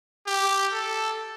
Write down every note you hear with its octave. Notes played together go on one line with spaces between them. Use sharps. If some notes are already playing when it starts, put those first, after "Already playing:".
G4
A4